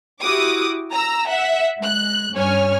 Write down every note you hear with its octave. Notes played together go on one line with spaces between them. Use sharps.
E4 F#4 G4 D6 D#6
A#5 E6
E5 F#5
G#3 F#6
G2 C#4 C#5 G#5 F6